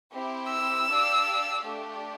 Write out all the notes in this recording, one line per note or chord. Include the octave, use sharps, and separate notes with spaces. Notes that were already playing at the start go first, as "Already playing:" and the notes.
C4 E4 G4
E6
D4 G4 D5 F5
A3 D4 G4